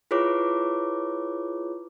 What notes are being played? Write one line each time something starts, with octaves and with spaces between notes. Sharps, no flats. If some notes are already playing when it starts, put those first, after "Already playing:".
E4 F4 G#4 B4 C#5 D6